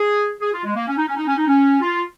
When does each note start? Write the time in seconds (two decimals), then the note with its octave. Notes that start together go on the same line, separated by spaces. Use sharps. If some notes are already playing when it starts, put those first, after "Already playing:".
Already playing: G#4
0.41 G#4
0.53 F4
0.64 G#3
0.76 A#3
0.88 C#4
0.97 D#4
1.08 C#4
1.17 D#4
1.27 C#4
1.37 D#4
1.47 C#4
1.81 F4